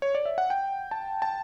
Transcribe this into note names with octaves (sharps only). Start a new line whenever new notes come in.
C#5
D5
E5
F#5
G5
A5
A5